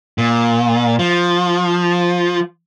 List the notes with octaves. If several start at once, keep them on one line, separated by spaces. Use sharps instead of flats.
A#2
F3